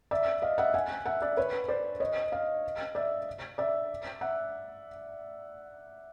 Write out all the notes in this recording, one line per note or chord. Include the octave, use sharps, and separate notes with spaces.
D5 E5
D#5 F5
E5 F#5
F#5 G#5
E5 F#5
D5 E5
B4 C#5
C5 D5
C#5 D#5
D#5 F5
D5 E5
D5 E5
E5 F#5